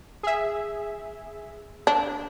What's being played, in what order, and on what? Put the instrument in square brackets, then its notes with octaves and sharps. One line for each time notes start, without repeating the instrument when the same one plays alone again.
[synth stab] G#4 E5
[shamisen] D4